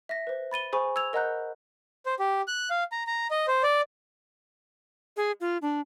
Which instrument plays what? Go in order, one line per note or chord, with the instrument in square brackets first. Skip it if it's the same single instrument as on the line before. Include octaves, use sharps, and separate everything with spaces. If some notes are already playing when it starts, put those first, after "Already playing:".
[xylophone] E5 A#6
B4 C5
B5 A6 D#7 G7
G#4 C5 G#5 B5 C#6
E6 G#6 F7
A#4 D#5 F#5 A#5 F#6 G6
[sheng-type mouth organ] C5
G4
F#6
F5
A#5
A#5
D#5
C5
D5
[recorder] G#4
F4
D4